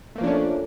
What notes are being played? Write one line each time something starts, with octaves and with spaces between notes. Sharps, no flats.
F3 A3 A#3 C#4 D4